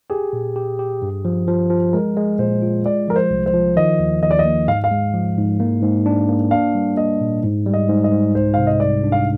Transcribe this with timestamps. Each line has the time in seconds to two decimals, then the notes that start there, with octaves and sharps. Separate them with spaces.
0.10 G4 G#4
0.33 A#2
0.56 G4
0.79 G4
1.02 G2
1.25 F3
1.48 F3
1.70 F3
1.93 G#3 A#4
2.16 G#3
2.39 A#2 C5
2.62 F4
2.84 G#3 D5
3.08 F3 A#4
3.16 C5
3.31 C2
3.46 C5
3.54 F3
3.76 D#3 D#5
3.99 D#2
4.22 D#2 D#5
4.31 D5
4.39 D#5
4.45 A#3
4.68 G#2 F5
4.84 F5
4.91 G#3
5.14 F3
5.38 G#2
5.60 A#3
5.82 G#2
6.06 D4
6.29 A#3
6.51 D4 F5
6.75 G3
6.97 A#3 D#5
7.21 A#2
7.44 G#2
7.66 G3
7.74 D#5
7.89 G#2
8.04 D#5
8.12 G#2
8.34 C2 C5
8.54 C3 F5
8.67 D#5
8.80 G3 D5
9.04 D4
9.12 F5